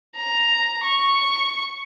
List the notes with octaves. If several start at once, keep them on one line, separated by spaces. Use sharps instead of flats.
A#5
C#6